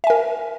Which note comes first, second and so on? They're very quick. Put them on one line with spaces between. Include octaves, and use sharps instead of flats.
E5 G#5 A#4